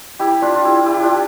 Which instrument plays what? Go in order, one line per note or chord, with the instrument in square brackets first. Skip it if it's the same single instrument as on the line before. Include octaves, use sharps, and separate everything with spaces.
[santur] E4 G4
D4 F4
F4
E4 G4
E4 G4
D4 F4